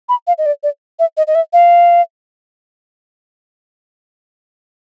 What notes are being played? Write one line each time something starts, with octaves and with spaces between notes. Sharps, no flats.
B5
F5
D#5
D5
D5
E5
D#5
D#5
E5
F5